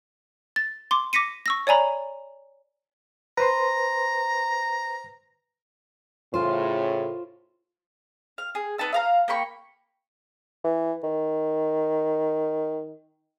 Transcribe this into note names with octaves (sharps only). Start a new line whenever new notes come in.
A6
C6 D6
D6 A#6 B6 C#7 D#7
C#6 E6 A#6
C#5 D5 G#5 A#5 B5
B4 C5 A#5 C6
A2 C#3 F4 C5
F5
G#4
B3 D#4 A5 E6
E5 F5 A#5
A#3 G5 B5 C#6
E3
D#3